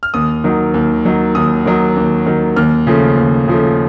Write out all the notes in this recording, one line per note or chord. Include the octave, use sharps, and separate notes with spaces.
F6
D#2 D#6
D#3 F#3
D#2
D#3 F#3
D#2 D#6
D#3 F#3
D#2
D#3 F#3
D#2 F6
C#3 F3 A3
D#2
C#3 F3 A3